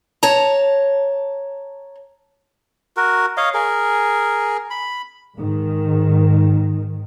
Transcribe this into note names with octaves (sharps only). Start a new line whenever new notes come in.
C#5 A5 A#5
F#4 A#4
C#5 D#5 F5
G#4 A#4
B5
G#2 D#3